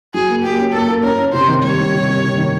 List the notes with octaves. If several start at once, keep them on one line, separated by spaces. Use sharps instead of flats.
F#3 G#4
A#3
A#3 G4
C#4
A#3 A4
A#3
C#4 A#4
C#4
C3 C5
D#3
G3 C#5
G3
C3
G3
C3
D#3